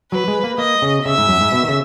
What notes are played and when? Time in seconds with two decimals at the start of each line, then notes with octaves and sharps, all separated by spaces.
0.11 F#3 B4
0.28 G#3
0.44 A#3
0.58 A#3 D#5
0.82 C#3
1.05 C#3 E5
1.18 G#2
1.29 F#2
1.41 G#2
1.52 B2
1.63 D#3
1.68 C#3